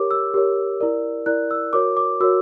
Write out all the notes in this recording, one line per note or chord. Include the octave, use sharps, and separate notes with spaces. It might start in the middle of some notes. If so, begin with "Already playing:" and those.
Already playing: G4 A#4 C#5 D6
E6
G4 A#4 C#5
E4 A#4 D5
E4 A#4 D5 F#6
E6
F#4 A#4 C#5 D6
D6
F#4 A#4 C#5 E6